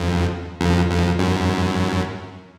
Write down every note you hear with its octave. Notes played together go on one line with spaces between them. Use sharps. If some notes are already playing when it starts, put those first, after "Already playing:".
Already playing: F2
F2
F2
F#2